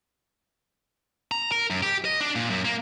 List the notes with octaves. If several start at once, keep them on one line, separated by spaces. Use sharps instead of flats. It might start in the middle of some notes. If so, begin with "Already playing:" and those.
A#5
A#4
F#2
G4
D#5
D4
A#2
F#2
A#3